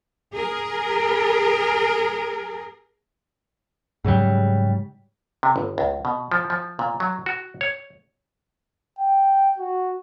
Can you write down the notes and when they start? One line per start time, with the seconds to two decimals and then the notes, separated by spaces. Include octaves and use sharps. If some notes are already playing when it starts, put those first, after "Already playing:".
0.33 G#4 A#4
4.05 G#2 C#3 F#3 G3
5.43 C3
5.56 G1
5.78 C#2
6.05 B2
6.31 F3
6.50 F3
6.79 A#2
7.00 F#3
7.26 F#4
7.61 C#5
8.99 G5
9.58 F#4